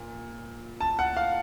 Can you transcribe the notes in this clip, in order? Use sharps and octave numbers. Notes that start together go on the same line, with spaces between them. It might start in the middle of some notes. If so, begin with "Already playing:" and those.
Already playing: A#2
A5
F#5
F5